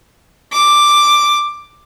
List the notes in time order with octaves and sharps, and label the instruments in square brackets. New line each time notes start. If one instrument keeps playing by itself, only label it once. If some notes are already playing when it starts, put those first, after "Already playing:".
[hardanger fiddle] D6